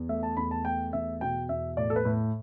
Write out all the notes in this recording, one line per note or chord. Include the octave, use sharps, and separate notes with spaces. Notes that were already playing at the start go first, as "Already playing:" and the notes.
Already playing: E2
A3 E5
A5
E2 B5
A5
A3 G5
E2 E5
B2 G5
E2 E5
A2 D5
A4
B4
A2